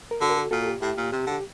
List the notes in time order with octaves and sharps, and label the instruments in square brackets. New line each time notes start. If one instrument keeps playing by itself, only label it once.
[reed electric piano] A#4
[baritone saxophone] D3 [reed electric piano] F#4 A4
[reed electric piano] A#4
F#4 A4
[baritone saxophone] A#2 [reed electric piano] F#4 A4
[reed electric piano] A4
G4
[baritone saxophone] A2 [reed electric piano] G4
[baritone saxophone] A#2
[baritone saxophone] C3 [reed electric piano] G4
[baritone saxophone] D3
[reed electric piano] G4